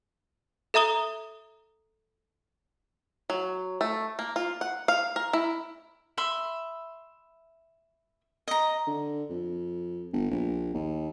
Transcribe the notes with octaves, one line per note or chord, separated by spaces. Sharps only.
A4 E5 A#5 D#6 G7
F#3
A3
A#3
F4
F#5
F5
A#4
E4
E5 B5 C6
D#5 A#5
D3
F2
G1
A#1
D#2